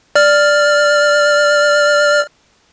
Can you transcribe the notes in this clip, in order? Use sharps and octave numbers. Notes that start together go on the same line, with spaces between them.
D5 F6